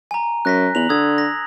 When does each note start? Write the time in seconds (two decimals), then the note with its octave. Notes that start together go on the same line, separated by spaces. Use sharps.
0.11 G#5 A#5
0.45 F#2 F#6 A#6 B6
0.75 E2 F7 F#7
0.89 D3 D#6 E6 G#6
1.18 A#6